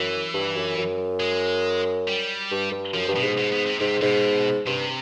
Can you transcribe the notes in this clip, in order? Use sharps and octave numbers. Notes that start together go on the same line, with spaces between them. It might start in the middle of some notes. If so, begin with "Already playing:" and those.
Already playing: F#2 E3
G2
F#2
F#2
G#3
G3
G2
G2
F#2 F3
G2
B2
G#2
B2
B2
C3
G#2 C3
G#2 B2
G2 C3